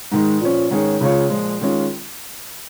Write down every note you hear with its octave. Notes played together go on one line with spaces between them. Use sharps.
G#2 D#3 G#3
A#2 F3 C#4
G#2 D#3 C#4 G#4 C#5
C#2 C#3 G#3 F4 C#5
A#2 F3 G#3
D#3 G#3 C#4 F4